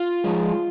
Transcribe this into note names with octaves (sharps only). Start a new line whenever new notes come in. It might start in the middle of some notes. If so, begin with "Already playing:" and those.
Already playing: F4
F3 G#3